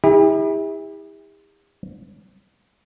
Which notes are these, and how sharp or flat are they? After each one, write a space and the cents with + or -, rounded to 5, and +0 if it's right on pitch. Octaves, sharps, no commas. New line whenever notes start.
E4 -30 G4 +45